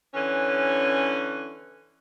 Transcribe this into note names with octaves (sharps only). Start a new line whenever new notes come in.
D3 E3 C#4